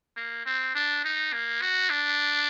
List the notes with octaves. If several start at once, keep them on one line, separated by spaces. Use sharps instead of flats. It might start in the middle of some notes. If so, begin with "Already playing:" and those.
A#3
C4
D4
D#4
A#3
F#4
D4